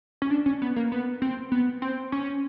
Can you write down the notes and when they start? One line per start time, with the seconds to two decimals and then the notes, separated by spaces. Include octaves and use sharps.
0.22 C#4
0.31 D4
0.46 C#4
0.62 B3
0.76 A#3
0.92 B3
1.22 C4
1.52 B3
1.82 C4
2.12 C#4